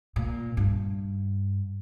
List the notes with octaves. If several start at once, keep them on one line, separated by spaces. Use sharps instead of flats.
A#2
G2